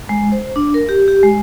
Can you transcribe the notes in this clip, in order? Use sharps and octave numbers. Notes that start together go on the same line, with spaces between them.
G#3
C5
D4
A#4
G4
G4
G#3